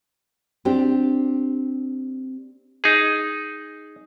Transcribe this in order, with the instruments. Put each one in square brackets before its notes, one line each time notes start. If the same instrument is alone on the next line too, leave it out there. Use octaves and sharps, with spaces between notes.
[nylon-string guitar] C4 D4 G4
[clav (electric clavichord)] D#4 G#4